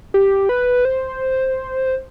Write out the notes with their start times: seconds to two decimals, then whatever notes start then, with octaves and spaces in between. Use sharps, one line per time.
0.14 G4
0.49 B4
0.85 C5